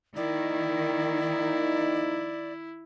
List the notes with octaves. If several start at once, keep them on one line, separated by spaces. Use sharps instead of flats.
D#3 F3 A#3 D#4 E4 D5